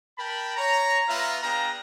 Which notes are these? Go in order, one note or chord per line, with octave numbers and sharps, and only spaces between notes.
A#4 G5 A5 B5
C#5 A#5
B3 F4 B4 E5 F5 A#5
B3 D4 G#4 F5 G5 A#5